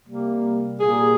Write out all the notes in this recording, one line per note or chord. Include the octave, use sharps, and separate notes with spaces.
C3 G3 A#3
A#2 G3 A#3 G#4